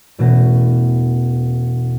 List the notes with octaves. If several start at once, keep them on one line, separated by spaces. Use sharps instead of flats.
E1 B2 A3 C#4 A#6